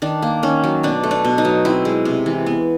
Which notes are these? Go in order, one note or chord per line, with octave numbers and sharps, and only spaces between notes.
D#3 D4
A#3
D#3 C#4
F#3
B2 D4
A3
D4
B2
D#4
F#3
C4 E4
G#3
C3
E3
B3